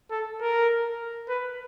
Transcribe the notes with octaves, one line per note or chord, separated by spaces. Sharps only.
A4
A#4
B4